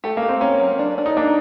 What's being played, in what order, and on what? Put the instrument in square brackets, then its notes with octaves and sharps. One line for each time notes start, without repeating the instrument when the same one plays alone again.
[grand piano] A3 [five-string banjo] G4
[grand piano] A#3
[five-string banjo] G4
[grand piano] C4
[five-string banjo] A#3 [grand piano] C#4
[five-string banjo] F#3
D4
D4
[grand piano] D#4
[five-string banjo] A#3 [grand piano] D4